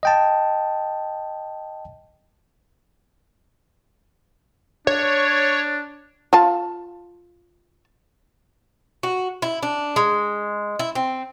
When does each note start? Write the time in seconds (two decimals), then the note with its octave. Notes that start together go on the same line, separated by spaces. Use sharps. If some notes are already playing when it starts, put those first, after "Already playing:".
0.03 D#5 G5 A5
4.87 D4 C#5
6.33 F4 F5 A5
9.03 F#4
9.42 E4
9.63 D4
9.96 G#3
10.79 E4
10.95 C4